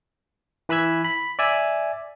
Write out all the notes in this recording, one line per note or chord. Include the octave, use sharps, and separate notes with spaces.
E3 B4 B5 E6 G#6
B5
D5 E5 G#5 E6